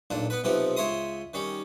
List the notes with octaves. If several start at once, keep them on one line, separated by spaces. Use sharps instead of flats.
B1 A#2 D4
B3 B4
B1 C3 F3 B3 G4
C#2 C#5 E5 C6 D#6
D#3 G3 C#4